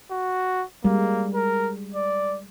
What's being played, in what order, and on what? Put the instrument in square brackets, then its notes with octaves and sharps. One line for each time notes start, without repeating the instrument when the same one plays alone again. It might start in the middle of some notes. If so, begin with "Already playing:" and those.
[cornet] F#4
[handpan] G3 G#3 [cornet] A#3
[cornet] A#4
D5